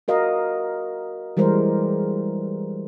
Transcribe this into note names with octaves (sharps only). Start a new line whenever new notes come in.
F#4 A#4 D#5 F5
E3 G3 G#3 A#4 C5